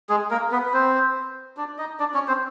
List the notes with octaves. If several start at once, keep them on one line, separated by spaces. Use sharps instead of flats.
G#3 G#4
A#3 A#4
B3 B4
B4
C4 C5
D4 D5
D#4 D#5
D4 D5
C#4 C#5
C4 C5